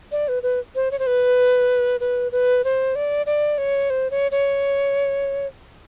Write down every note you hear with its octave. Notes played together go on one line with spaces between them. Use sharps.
D5
B4
B4
C5
C#5
C5
B4
B4
B4
C5
D5
D5
C#5
C5
C#5
C#5